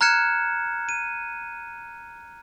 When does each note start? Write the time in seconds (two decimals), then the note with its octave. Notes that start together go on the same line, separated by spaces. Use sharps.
0.01 A#5 F6 F#6 G#6 C#7 E7
0.89 D#7